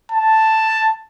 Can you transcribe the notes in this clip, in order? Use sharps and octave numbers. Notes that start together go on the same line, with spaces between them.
A5